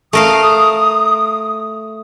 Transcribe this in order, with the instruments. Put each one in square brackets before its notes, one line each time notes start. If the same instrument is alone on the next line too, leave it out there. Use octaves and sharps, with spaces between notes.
[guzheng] A3 A#4 F5 [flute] D#6